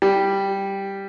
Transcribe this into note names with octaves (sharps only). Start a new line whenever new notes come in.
G3